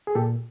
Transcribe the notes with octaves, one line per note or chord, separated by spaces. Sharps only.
G#4
A#2 G4 A4